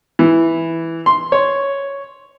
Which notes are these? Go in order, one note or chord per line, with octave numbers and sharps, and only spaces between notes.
E3
C6
C#5